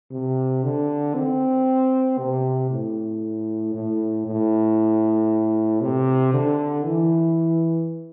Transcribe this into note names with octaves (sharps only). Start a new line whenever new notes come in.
C3
D3
C4
C3
A2
A2
A2
C3
D3
E3